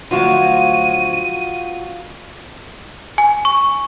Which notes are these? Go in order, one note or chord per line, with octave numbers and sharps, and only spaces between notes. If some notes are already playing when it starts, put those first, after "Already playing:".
D2 F3 F#3 F4 F#4 D#7
G#5
C#6